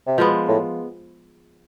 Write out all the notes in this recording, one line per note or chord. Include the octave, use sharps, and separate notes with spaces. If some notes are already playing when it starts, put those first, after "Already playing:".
C3
B2 F3 G#3 B3
A2